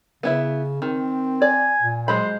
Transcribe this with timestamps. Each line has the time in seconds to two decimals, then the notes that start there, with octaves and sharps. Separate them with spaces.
0.23 C#3 B3 E4 E5
0.82 D#3 C4
1.42 D5 G#5
1.82 A#2
2.08 F#3 G#3 C5 B5